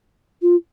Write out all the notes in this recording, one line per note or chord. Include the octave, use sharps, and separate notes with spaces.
F4